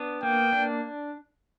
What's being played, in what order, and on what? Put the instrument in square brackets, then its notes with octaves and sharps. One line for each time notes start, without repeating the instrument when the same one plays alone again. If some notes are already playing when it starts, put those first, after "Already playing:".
Already playing: [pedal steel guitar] B3 D4
[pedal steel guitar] A#3 [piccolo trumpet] G5
[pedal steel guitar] D4